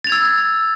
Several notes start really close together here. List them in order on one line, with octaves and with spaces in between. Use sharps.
A6 F7 G#6 E6